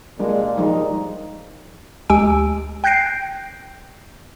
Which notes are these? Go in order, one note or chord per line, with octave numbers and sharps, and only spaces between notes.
A#2 G3 G#3 D4
F3 G3 G#3 D#4
D2 G#3 G4 G#5 E6 D7
G5 F#6 G6 A#6 C7 D7